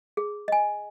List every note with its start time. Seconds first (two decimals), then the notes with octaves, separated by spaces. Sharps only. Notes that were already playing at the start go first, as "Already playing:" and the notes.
0.17 G#4
0.48 D#5 G#5